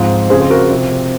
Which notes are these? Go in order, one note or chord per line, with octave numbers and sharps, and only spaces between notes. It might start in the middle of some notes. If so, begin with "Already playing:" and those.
Already playing: G#2 F3 C4
F2 C#3 F3 G#4 C5
C5
F#4 A#4
C3 F3 C4